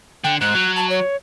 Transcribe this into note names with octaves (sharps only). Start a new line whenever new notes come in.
D3 G5
G#2 F#6
F#3
A5
C#5